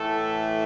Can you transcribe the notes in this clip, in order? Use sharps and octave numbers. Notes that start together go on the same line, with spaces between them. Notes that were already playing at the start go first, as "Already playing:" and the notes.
Already playing: A2 E3 A3 A4